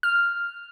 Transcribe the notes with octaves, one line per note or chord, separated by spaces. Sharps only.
F6